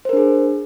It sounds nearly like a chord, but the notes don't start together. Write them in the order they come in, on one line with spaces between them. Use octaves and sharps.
C5 A#4 D4 G#4